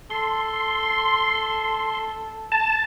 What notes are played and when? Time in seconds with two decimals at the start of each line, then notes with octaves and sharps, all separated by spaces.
0.10 A4 C6
2.52 A5